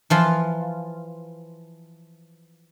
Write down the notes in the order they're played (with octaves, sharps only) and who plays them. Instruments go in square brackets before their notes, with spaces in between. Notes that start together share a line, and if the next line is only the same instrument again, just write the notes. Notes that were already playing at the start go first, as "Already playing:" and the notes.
[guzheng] E3 F3 F4